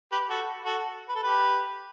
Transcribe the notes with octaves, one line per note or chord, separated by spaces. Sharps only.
G4 B4
F#4 A4
F#4 A4
B4
A4
G4 B4